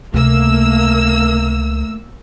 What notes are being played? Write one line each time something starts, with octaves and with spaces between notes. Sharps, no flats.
C#2 C3 A3 A#3 E6